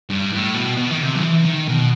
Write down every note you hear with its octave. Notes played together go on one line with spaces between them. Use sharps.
G2
A2
B2
B2
D#3
C3
F#3
E3
D#3
B2